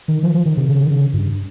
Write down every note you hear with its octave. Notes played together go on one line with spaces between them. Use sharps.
D#3
F3
F3
D#3
C3
C#3
D#3
C#3
G2